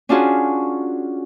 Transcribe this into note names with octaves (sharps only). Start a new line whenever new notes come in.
C#4 D4 F4 F#4 G#4